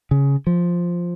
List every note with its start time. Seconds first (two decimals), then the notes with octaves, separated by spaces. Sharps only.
0.11 C#3
0.47 F3